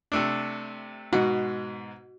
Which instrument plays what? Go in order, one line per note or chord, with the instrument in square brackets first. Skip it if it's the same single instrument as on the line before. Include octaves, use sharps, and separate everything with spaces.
[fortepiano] C3 A3 D4
[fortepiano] G#2 B2 [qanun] F#4